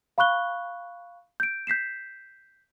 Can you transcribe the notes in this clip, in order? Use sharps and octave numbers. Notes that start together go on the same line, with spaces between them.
F5 B5 C#6 F#6 G7
G6 D7
G6 B6 C7 E7